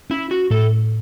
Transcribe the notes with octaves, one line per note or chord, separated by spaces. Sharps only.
C#4 E4
F#4
A2 A4